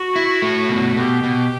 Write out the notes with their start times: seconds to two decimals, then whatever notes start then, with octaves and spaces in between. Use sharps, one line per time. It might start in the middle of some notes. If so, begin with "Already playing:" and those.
Already playing: F#4
0.16 E4
0.42 A3
0.69 B2
0.97 B2 G4
1.24 B2